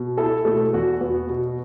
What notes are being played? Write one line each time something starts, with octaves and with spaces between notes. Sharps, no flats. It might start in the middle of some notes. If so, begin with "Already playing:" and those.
Already playing: B2
E4 A4 A5
B2 A3 A4
E2 F#4
B3 F#4
B2